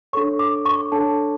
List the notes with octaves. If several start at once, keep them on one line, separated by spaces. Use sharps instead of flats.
D4 A4 C#5 C#6
D6
C#6
D4 A4 C#5 A5